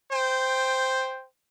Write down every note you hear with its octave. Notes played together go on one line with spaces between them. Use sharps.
C5 G5